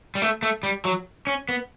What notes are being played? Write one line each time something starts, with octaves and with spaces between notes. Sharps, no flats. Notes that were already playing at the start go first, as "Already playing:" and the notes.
G3
A3
A3
G3
F#3
C#4
B3